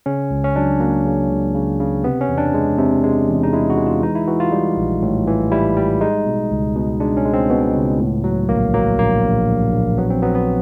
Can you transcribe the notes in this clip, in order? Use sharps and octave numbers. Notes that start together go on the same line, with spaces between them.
C#3 C#4
C#2
C#4
F#3 D4
F#3 A#3
C#3
C#2
C#3
C#3
C3 B3
C#4
E2
D4
G#3
C3
G#3
E2
D#4
G#3 E4
F#4
G#3
F4
E3 D#4
E4
E3 F#4
F4
G3
A#1
A2
E3
G3 E4
G3
G#3 D#4
B2
C#2
B2
G#3 D4
C#4
G#3
C4
B2 B3
C#2
A2
F#3
A#1 A#3
F#3 A#3
A#1 A#3
A#1
A#1
A#1
F#3 B3
C4
F#3 B3
B3